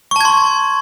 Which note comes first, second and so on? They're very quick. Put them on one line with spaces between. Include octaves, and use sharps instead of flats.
C#6 A5 G#6 C6